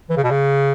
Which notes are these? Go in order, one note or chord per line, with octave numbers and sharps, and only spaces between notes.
E3
C#3
B2
C#3